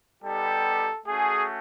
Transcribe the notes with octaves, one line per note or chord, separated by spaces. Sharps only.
G3 B3 D#4 G4 A4
A3 C#4 F#4 G#4